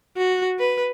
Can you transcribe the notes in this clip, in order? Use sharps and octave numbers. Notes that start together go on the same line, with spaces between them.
F#4
B4